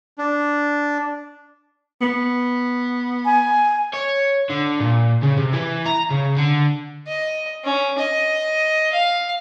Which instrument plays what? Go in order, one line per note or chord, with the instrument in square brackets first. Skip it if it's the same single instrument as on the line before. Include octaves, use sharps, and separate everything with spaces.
[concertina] D4
[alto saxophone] B3
[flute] G#5
[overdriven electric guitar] C#5
D3
A#2
C#3
C3
E3
A#5
C#3
D3
[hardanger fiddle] D#5
C#4
D#5
F5